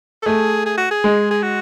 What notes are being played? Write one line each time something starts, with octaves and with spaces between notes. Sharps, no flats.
A4
A3 G#4
G#4
F#4
G#4
G#3
G#4
F#4